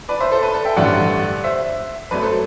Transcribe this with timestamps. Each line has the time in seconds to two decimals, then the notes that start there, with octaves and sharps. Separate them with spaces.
0.09 B4 D5
0.20 C5 E5
0.32 A4 C5
0.43 B4
0.54 A4
0.65 E5 G5
0.76 A1 G2 D3 G3 D5 F#5
1.44 C5 E5
2.11 F#2 F#3 A3 B4 D5
2.23 A4 C5